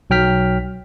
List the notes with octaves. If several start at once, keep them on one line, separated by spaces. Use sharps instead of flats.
B1 F#3 G5 F6 B6